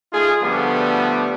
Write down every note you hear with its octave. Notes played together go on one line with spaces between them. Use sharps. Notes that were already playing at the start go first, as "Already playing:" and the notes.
A3 D#4 F4 G#4
D3 F3 G3 A3 B3